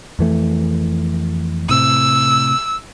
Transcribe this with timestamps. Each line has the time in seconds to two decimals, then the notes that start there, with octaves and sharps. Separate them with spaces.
0.19 F2 E3 A3
1.69 A2 C3 E6